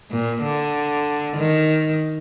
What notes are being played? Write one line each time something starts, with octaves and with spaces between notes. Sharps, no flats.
A#2
D3
D#3